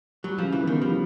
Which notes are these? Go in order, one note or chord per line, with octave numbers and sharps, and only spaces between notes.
F#3 G3
C#3 F3
E3
D#3 B3
F3 G3